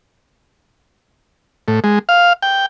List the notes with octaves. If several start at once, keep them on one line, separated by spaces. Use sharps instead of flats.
A2
G#3
F5
G5